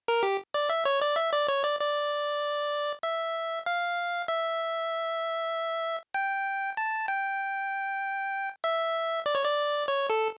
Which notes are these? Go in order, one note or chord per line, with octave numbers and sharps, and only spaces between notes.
A#4
G4
D5
E5
C#5
D5
E5
D5
C#5
D5
D5
E5
F5
E5
G5
A5
G5
E5
D5
C#5
D5
C#5
A4